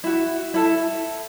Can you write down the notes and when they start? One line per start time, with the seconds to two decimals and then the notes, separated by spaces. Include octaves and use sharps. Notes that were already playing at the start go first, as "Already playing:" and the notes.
0.04 E4 F#4
0.54 E4 A4 A5